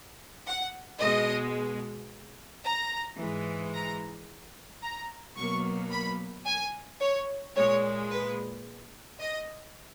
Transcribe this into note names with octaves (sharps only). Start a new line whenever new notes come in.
F#5
B2 G#3 D#5
A#5
G#2 E3 G#3
A#5
A#5
B2 F#3 A#3 C#6
B5
G#5
C#5
A#2 G#3 C#5
B4
D#5